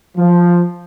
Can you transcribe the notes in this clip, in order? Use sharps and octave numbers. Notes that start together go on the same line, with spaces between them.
F3